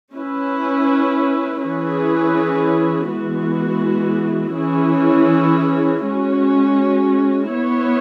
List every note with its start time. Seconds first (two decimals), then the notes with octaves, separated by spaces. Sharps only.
0.14 C#4 E4 B4
1.62 E3 C#4 E4 G#4 B4
3.09 E3 G#3 B3 F#4
4.57 E3 C#4 E4 G#4
6.05 G#3 C#4 F#4
7.53 B3 E4 C#5